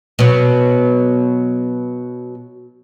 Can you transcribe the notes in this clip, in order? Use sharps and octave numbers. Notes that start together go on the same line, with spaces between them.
B2 F#3